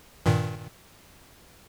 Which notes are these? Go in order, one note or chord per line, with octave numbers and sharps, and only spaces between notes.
G2 A#2 D#3